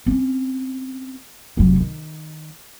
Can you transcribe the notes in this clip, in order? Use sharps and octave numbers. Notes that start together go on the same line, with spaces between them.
C4 C#4
F1 F#3
D#3